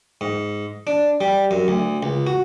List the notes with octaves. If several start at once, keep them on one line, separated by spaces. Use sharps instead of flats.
G#2
D4
G3
F#2
D2
C#2
F#4